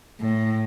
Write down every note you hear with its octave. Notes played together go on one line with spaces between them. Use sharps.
A2